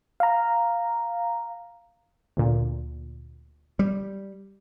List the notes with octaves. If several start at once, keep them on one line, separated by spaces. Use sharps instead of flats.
F5 A#5
D2 A#2
G3